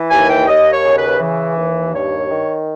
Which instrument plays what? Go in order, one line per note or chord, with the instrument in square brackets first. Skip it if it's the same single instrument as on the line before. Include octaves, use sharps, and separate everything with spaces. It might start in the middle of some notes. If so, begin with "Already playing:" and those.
Already playing: [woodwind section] E3
D#2 G#5
G5
D#2 D#5
C#5
C#3
B4
E3
D#2
G2 C#5
D#3